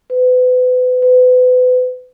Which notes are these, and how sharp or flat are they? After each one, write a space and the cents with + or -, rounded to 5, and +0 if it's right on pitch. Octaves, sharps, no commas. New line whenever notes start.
B4 +35
B4 +35